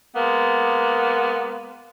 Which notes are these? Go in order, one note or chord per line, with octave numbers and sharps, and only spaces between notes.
G#3 A#3 B3